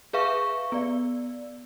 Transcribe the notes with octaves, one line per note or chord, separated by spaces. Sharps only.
G#4 B4 E5 F5 C#6
B3 D5